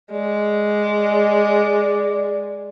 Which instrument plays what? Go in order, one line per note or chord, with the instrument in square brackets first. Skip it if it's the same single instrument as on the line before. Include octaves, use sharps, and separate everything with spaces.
[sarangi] G#3 [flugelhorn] D5